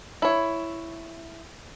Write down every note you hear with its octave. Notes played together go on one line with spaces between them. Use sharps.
E4 C#5